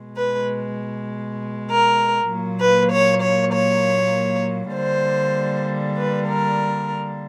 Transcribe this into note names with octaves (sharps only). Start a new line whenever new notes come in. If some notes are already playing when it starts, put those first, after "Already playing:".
Already playing: B2 G#3
B4
A#4
A#2 F#3 A#3
B4
C#5
C#5
C#5
D3 G3 A#3 C5
B4
A#4